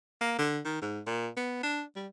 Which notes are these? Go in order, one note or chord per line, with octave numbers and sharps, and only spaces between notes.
A#3
D3
D#3
G#2
A#2
B3
D4
G3